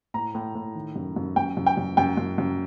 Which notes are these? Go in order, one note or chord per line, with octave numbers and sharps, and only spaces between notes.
A2 A#5
A2
A2
D#3
F#2
F#2
F#2 G5
F#2
G5
F#2
F#2 G5
F#2
F#2